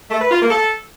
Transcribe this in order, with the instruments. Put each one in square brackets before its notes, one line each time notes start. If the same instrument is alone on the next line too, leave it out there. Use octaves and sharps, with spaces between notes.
[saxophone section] A3
B4
F4
A#3
A4